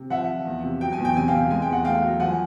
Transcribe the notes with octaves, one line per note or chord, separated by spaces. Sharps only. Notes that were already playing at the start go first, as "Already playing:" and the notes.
Already playing: C3
F3 E5 F#5
F3
E2
C3
F#3 G5
G#5
E2
G5
C3 G#5
F5 G5
C3
G#3 G#5
G5
E2
F#5
A3 F5 G5
F#3
F3 F#5 G#5